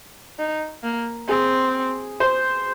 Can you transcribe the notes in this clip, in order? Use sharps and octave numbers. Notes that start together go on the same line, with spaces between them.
D#4
A#3
C4 G#4
C5